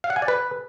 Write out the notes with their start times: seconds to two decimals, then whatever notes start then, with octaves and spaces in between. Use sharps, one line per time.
0.04 F5
0.10 F#5
0.16 G#5
0.22 D5
0.28 B4